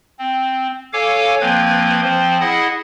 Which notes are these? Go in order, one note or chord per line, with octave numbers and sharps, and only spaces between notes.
C4
A4 C#5 F5 G#5 D6
F3 A#3 C4 B4 G#6
F3 C4 C5
E4 G#4 D#5 F#5